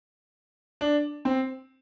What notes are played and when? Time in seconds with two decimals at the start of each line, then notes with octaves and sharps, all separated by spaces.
0.81 D4
1.25 C4